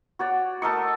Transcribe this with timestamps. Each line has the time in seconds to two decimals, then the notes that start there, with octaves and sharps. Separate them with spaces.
0.19 F#4 C#5 D5
0.62 A3 A#4 D#5 C#6